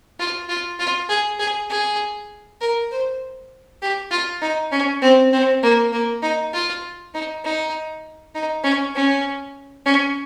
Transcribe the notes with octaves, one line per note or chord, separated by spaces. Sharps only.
F4
F4
F4
G#4
G#4
G#4
A#4
C5
G4
F4
D#4
C#4
C4
C4
A#3
A#3
D#4
F4
D#4
D#4
D#4
C#4
C#4
C#4